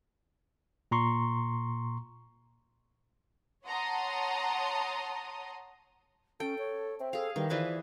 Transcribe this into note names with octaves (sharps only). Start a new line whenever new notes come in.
A#2 A#5 C6 C#6
C#5 F#5 A5 A#5 C6 D#6
C#4 A4 G5
C#5
C4 E5
G#4 A4 F5
D#3 E3 G3
E3 F3 G#4 B4 D5